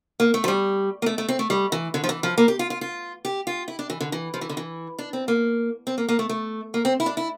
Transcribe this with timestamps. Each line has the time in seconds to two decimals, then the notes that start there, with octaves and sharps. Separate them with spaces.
0.20 A#3
0.34 A3
0.44 F3
0.48 G3
1.02 A#3
1.06 A3
1.18 A3
1.29 C4
1.39 A3
1.50 G3
1.72 E3
1.94 D3
2.04 F3
2.09 E3
2.23 F3
2.38 A#3
2.48 G4
2.59 F4
2.70 F4
2.81 F4
3.25 G4
3.47 F4
3.68 E4
3.79 D4
3.90 E3
4.00 D3
4.12 E3
4.34 F3
4.41 E3
4.49 D3
4.57 E3
4.99 D4
5.13 C4
5.28 A#3
5.87 C4
5.98 A#3
6.09 A#3
6.19 A3
6.29 A3
6.74 A#3
6.85 C4
7.00 E4
7.06 D4
7.17 E4